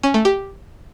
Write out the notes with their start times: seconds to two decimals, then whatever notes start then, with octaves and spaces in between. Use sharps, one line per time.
0.03 C#4
0.14 A3
0.25 G4